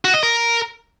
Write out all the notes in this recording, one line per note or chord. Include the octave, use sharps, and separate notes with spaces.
F#4
D#5
A#4